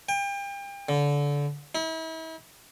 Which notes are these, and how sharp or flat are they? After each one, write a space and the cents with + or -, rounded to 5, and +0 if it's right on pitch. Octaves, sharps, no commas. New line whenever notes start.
G5 +35
D3 -25
E4 -40